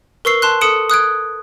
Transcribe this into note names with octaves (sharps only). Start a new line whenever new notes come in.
A#4 B4 C#6 E6 C7 G7
A5 C6 F#6
A4 D#6 C#7 D7 E7
D#6 F#6 G#6 D7